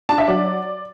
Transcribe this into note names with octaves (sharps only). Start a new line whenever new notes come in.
D4 A5
E5
F#3 D5